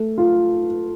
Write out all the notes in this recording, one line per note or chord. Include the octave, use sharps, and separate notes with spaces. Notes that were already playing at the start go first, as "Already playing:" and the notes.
Already playing: A3
F4